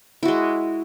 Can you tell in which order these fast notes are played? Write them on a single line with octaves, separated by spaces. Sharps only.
E4 F#4 G#3